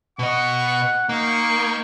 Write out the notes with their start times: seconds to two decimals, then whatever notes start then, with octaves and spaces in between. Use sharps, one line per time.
0.19 B2 D#5 F#5 C#6
1.09 A#3 D#4 F5 G5 C#6